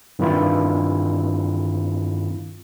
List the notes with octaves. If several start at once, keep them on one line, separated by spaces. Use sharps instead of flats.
G2 D#3 C4 E4 F4